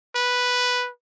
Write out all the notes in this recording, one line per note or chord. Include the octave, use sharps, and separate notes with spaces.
B4